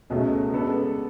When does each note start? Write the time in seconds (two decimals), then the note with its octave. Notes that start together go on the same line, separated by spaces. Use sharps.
0.10 C#2 B2 A3 C#4 G#4
0.52 C#3 G#3 B3 D4 A4